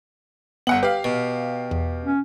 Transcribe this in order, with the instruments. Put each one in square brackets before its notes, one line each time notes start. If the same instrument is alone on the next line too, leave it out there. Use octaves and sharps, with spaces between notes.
[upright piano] G1 F#5 F#7 [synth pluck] B3
[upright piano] G4 F5 [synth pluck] B4
[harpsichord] B2
[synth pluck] E2
[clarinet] C#4